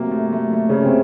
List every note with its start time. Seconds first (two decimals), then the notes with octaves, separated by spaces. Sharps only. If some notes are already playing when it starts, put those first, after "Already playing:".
Already playing: C3 F#3 A3 A#3
0.11 A3
0.32 A3
0.53 A3
0.69 C#3 C#4
0.84 C3 C4